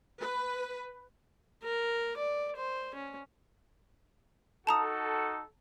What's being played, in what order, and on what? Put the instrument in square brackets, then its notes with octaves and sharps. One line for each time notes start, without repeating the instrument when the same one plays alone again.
[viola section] B4
[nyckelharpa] A#4
D5
C5
C#4
[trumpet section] D#4 F#4 A4 [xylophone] A5 A#5 D#6